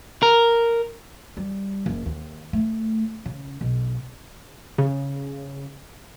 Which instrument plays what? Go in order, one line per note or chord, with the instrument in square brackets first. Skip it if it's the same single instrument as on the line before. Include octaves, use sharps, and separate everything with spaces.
[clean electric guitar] A#4
[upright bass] G3
F#1
D#2
A3
C#3
B1
[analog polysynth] C#3